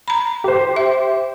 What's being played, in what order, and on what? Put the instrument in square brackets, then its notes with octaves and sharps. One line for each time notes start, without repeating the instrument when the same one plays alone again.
[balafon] A#5 B5
[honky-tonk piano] G4 C5
[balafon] E5